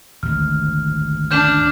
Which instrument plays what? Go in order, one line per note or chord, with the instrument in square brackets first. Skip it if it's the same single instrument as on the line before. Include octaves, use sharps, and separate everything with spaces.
[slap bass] G#1 D2 [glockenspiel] F6
[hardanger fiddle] D4 [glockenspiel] F6 G6 E7